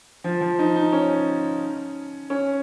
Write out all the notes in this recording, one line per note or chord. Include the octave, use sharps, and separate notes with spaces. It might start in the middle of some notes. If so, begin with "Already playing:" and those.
F3
F3
D#4
D#4
C#4
C#4